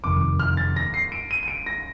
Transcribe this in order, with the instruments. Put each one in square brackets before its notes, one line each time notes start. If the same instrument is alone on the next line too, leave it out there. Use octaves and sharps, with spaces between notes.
[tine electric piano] G1 F2 C3 D#3 [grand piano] D6
[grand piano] F6
A6
A#6
C7
D7
D#7
D#7
D7
A#6